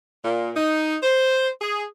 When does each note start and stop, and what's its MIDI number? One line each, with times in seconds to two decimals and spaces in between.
0.25 0.51 46
0.56 0.97 63
1.02 1.48 72
1.61 1.84 68